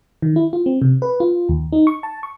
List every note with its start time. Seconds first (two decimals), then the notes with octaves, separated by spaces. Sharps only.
0.22 D#3
0.36 E4
0.53 F4
0.66 C4
0.82 C3
1.02 B4
1.20 F4
1.49 D#2
1.72 D#4
1.87 C#6
2.03 A5
2.23 C#6